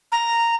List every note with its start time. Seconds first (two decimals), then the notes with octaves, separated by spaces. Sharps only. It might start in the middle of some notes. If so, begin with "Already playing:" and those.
0.12 A#5